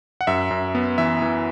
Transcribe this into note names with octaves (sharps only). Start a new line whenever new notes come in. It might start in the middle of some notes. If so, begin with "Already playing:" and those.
F#5
F#2 E5
F#2
B3
E3 E5
E3